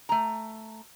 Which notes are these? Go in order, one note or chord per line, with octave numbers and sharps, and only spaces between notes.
A3 A#5